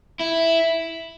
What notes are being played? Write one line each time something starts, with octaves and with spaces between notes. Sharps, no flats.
E4